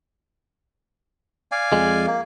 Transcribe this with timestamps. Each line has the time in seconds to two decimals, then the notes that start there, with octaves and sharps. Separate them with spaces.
1.52 D5 F5 G#5
1.72 F2 G#3
2.06 A#3